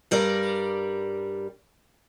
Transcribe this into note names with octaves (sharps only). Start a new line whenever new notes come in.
G2 G3 A#4 D5